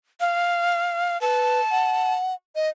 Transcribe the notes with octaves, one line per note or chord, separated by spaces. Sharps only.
F5
B4 A5
F#5
D#5